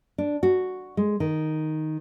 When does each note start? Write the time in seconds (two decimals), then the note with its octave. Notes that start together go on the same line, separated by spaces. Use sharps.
0.18 D4
0.43 F#4
0.97 G#3
1.20 D#3